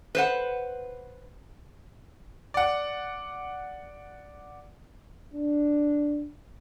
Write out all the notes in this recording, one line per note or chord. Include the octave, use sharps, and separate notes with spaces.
B4 C5 F#5
D5 F#5
D4